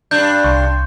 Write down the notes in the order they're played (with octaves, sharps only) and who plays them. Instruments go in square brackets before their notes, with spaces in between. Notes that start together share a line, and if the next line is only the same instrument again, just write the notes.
[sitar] G2 D4 [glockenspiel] G6
[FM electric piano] C2 C6 C#6